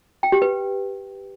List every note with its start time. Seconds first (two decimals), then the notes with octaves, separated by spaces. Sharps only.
0.23 G5
0.32 G4
0.42 B4